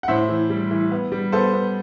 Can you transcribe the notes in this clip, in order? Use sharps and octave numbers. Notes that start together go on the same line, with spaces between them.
F#5
A2 C5 E5
E3
G3
E3
B3
G3
B3 A4 C5
B3